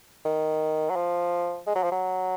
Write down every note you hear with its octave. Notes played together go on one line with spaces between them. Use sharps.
D#3
F#3
F3
G#3
F#3
F3
F#3